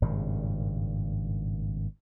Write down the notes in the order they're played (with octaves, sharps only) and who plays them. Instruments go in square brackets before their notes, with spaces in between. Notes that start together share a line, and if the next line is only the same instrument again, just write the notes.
[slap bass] G#1 G2 A#2 C#3